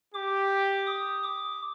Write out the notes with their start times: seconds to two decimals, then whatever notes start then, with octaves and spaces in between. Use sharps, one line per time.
0.14 G4 D6
0.87 D#6
1.24 D6